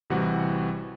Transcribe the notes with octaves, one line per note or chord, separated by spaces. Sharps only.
A1 C3 E3 G3 F#4 F#5